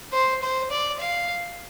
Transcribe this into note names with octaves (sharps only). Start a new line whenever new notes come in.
C5
C5
D5
F5